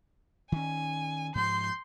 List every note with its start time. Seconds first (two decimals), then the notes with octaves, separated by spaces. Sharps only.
0.52 D#3 C#4 G#5
1.35 G#2 F3 C6 G6